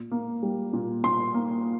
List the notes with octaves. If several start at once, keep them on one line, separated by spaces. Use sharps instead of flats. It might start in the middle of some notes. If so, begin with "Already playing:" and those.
Already playing: A#2
A#3
G3
A#2
A#2 C6
A#3